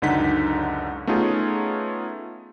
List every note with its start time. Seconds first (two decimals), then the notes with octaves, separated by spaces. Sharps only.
0.02 C#2 F#2 D3 D#4 F#5 B6
1.07 A3 B3 C#4 D#4 F4 G#4